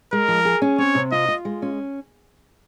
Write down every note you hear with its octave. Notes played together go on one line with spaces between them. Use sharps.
G#3 A#4
F3
G#4
C#4
C4 C#5
C3
F4 D#5
F4
G#3
C#4